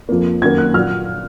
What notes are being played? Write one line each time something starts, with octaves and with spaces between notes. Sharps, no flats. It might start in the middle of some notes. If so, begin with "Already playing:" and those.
F2 F3 A#3
F#2 D#3 F#3 A#3 G#6
F#6
A#2 F#3 F6